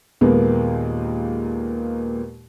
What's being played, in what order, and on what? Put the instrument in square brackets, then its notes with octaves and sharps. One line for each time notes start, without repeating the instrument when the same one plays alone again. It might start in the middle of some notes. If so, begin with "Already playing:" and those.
[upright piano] D#2 A#2 G#3 A#3 B3